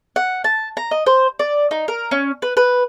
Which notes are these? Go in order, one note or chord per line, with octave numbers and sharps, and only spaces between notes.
F#5
A5
A#5
D#5
C5
D5
D#4
A#4
C#4
B4
B4